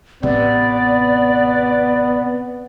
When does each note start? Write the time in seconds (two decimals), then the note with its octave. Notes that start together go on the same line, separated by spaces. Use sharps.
0.23 A1 C3 B3 D5